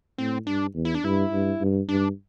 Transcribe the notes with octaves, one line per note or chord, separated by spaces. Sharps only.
A2 C4
G2 D4
E2
E4
D4
G2 E4
G2
G2
G2 D4